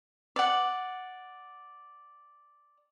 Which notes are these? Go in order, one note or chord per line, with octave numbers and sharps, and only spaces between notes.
D5 F#5